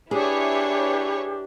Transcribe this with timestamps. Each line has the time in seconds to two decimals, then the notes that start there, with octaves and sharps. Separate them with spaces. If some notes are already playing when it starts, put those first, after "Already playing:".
0.11 D4 E4 G4 G#4 B4 C#5